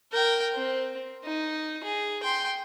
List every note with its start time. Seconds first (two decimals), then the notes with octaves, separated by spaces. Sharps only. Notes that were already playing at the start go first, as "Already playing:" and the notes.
0.12 A#4 G5
0.54 C4
1.24 D#4
1.84 G#4
2.23 G5 C6